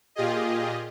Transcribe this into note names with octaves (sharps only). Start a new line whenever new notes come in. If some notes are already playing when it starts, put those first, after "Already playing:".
A#2 F4 G4 G#4 D#5